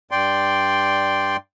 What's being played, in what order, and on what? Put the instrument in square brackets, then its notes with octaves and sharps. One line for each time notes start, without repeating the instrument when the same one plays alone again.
[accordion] G2 D5 G5 C6